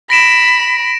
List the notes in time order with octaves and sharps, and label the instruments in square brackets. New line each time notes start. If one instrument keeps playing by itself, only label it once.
[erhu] B5 [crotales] A#6 D7 E7